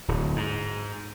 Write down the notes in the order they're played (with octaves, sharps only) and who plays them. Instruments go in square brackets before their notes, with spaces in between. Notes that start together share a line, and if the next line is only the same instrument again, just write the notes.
[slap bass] D1
G#2